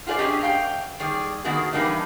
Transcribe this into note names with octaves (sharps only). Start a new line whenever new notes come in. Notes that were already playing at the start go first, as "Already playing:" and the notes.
F4 F#4 G#4 B4 D5
C#4 D4 G4 G#4 D#5
F#2 F5 G5
D#3 G3 G#4 D5
D#3 A#3 B3 F#4 G#4
E3 G3 A#3 D4 D#4